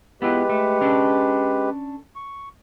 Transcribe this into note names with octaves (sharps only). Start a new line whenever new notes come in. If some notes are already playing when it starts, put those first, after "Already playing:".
G#3 B3 E4 F4 G4 B4
A3
C#4 D4 A4
C#6